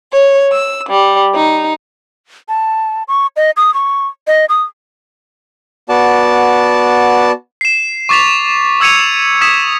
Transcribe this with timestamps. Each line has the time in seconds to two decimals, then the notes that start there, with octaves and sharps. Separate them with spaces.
0.11 C#5
0.52 E6
0.89 G3
1.34 D#4
2.49 A5
3.08 C#6
3.36 D#5
3.57 D#6
3.74 C#6
4.27 D#5
4.49 D#6
5.89 B3 F#4 D5 A5
7.61 C7 E7
8.09 C#6 D6 A6 B6 F7
8.80 D6 E6 G#6 C#7 D#7 F7
9.41 D#6 E6 G#6 B6 E7